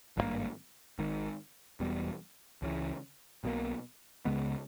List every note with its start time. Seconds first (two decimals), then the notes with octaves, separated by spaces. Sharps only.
0.17 G#1 G2 D#3 A#3
0.99 G#1 G#2 D#3
1.80 E1 E2 B2 G3
2.62 C#2 C#3 E3
3.44 B1 B2 G3 A#3
4.25 C#2 C#3 G#3 B3